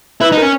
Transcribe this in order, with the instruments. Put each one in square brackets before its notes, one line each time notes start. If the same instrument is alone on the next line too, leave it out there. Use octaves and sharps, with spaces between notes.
[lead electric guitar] E4 [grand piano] B4
[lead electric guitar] D#4
[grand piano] A#4
[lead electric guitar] C#4